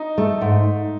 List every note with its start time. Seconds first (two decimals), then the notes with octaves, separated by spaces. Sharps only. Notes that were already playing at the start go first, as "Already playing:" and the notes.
Already playing: D#4
0.18 A3
0.41 G#2